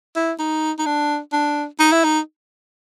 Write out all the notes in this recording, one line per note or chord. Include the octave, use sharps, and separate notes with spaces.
E4
D#4
D#4
D4
D4
D#4
E4
D#4